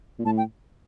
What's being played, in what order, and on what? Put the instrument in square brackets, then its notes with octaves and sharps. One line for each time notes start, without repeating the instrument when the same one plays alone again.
[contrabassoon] A#2
[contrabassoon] A2 [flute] A5
[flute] G5